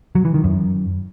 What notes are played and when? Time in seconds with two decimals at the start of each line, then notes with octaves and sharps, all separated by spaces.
0.15 F#3
0.25 E3
0.34 D#3
0.44 F#2